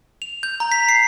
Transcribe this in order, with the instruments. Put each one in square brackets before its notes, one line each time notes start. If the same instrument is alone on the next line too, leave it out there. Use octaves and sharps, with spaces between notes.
[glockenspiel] F7
G6
A#5
B6
C7